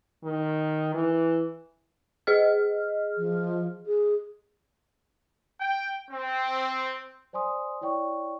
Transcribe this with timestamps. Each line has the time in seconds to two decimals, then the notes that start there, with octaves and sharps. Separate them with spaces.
0.24 D#3
0.95 E3
2.27 G#4 D#5 F6
3.18 F3
3.86 G#4
5.60 G5
6.09 C4
7.33 C5 D5 G#5 C6 D#6
7.81 E4 C#5 D5 G5 C#6